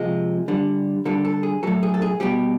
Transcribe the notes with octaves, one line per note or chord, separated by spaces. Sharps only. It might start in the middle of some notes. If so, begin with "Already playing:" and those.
Already playing: C3 F3 G#3 G#4
D3 G3
D3 G3 A4
A4
G#4
A2 F#3 A4
G#4
A4
G#4
B2 G3 G4